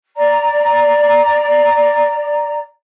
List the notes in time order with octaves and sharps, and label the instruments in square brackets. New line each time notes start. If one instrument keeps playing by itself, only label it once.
[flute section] D5 A#5